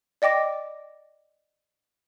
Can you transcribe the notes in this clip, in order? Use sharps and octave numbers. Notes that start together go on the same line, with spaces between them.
D5 D#5 G5 D6 A#6